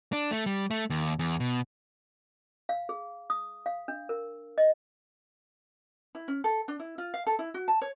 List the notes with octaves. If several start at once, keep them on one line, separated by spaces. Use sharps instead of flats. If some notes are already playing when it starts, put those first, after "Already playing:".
D4
A3
G3
A3
D#2
E2
B2
F5
G#4
D#6
F5
D4
A#4
D#5
E4
C#4
A4
D4
E4
F4
F5
A4
E4
F#4
A5
C#5